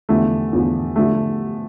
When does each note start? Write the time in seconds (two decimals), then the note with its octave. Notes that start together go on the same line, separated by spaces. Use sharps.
0.09 E2 D3 F3 A3
0.52 E2 D3 F3
0.96 D3 F3 A3